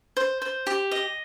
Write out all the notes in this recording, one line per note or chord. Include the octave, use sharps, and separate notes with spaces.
C5
C5
G4
D#5